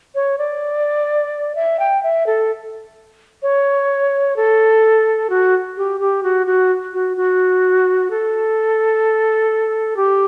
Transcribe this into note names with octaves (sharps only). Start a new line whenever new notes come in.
C#5
D5
E5
G5
E5
A4
C#5
A4
F#4
G4
G4
F#4
F#4
F#4
F#4
A4
G4